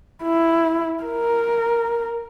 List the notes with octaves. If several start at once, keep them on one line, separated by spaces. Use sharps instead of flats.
E4
A#4